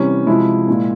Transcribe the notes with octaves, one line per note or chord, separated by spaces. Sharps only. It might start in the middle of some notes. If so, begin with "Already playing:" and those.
Already playing: C3 E3 G3 C#4
C3 F3 G#3 E4
A#2 G#3